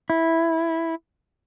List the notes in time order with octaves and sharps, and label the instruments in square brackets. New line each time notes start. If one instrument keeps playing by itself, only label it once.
[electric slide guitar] E4